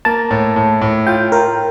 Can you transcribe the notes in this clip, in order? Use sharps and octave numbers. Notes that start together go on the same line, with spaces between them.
A#3 A5
A2
A2
A2
F4 G5
F4 A#4